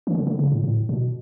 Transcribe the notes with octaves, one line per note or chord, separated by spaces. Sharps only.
E3
D3
D3
C#3
A2
A2
B2